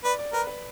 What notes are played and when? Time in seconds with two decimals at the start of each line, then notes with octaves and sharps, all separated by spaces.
0.04 B4 D5
0.19 D5
0.33 A#4 B4
0.47 B4